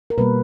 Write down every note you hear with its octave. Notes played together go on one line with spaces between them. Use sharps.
A#4
B2 G3 A#3 B4